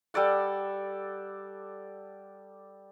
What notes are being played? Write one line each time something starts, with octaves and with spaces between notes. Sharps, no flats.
G3 A4 D5 F#5